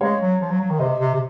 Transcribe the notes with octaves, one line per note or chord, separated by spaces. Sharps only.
G#3 C#5 F5
F#3
F3
F#3
F#3
D#3
C3 C5 D#5
C3
C3